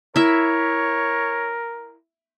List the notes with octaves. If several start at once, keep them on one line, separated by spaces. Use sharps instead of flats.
E4 A#4 C#5 E5